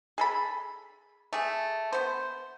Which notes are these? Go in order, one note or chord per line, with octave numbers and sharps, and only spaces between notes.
G#4 A4 B5
A3 G#4
B3 C5